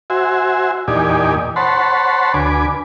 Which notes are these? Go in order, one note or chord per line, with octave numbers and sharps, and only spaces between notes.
F#4 C5 E5 G#5
E2 A#2 D#4 G4 D5 G#5
C5 C#5 F#5 A5 B5 C6
D2 B4 G#5 D6